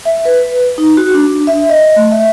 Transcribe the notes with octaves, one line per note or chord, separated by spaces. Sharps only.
E5
B4
D#4
F#4
D4
E5
D#5
A3
E5